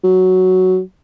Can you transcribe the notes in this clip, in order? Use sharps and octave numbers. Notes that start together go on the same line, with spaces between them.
F#3